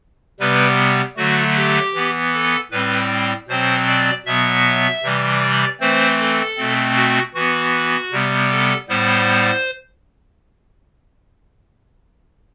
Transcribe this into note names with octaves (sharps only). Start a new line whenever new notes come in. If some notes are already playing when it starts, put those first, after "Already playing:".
C3 G3 B3 B4
D3 F#3 A3 F#4
G4
E3 B3
A4
A2 G3 C4 B4
B2 F#3 C4 C5
D5
B2 F#3 B3 E5
C3 E3 G3
D5
E3 A3 C4 C5
A4
B2 A3 C4
F#4
E3 B3 F#4
C3 G3 B3
A4
A2 G3 B3 C5